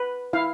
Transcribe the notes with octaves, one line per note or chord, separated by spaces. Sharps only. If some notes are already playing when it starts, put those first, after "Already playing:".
Already playing: B4
E4 F5